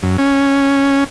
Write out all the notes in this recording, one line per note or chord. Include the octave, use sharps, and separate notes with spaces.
F#2
C#4